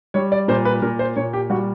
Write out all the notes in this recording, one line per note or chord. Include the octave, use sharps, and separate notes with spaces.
G3 C#5
D5
A#2 C5
B4
A#2 A#4
C5
A#2 C#5
G4
G3 F#4